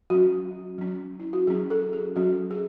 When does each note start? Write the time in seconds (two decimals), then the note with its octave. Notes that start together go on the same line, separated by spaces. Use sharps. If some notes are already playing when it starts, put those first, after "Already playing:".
0.10 F#3 C#4 F#4
0.78 F#3 C#4
1.20 E4
1.33 F#4
1.47 F#3 C#4 G#4
1.70 A4
1.93 G#4
2.16 F#3 C#4 F#4
2.51 G#4